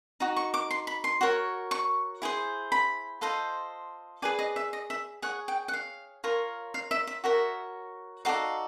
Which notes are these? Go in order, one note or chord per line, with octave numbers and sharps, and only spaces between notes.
D#4 F#4
C#6
D6
C6
B5
C6
F#4 A#4 C#5
C#6
E4 G#4 C5
B5
F4 A4 C5 D#5
G#4 B4 D5 G#5
D#5
E5
D#5
E5
G#4 C#5 F#5
G5
F#5
F5
F4 A#4 C#5
F5
E5
E5
F#4 A#4 C#5 E5
D#4 F#4 A4 D5 F5